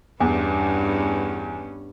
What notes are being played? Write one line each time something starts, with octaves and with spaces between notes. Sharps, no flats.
E2 G2 B3 C#4